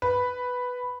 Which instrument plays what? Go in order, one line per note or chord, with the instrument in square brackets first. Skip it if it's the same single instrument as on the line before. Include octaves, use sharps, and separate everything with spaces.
[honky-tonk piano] B4